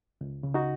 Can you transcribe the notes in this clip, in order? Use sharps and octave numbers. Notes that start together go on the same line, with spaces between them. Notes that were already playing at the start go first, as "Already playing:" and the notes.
C#2
C#3
D#4 F#4